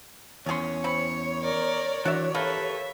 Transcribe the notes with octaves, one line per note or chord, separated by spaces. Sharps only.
E2 D#3 C#4 G#4 C#5 C6
C4 B5 C#7
A#4 D5
E3 D4 F#4 D5 E5
A#3 G4 A4 B4 E5